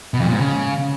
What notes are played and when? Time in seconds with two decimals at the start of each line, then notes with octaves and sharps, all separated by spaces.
0.14 B2
0.20 F2
0.26 A#2
0.33 G#2
0.39 C#3